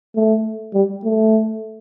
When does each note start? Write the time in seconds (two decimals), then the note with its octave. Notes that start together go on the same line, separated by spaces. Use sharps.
0.15 A3
0.74 G3
1.04 A3